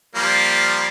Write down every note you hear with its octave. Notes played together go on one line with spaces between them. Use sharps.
F3 G3 A#3